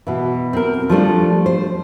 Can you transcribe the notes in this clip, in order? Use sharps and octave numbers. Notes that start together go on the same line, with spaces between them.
B2 E3
C4 A#4
F3 G3 A3 D4
C5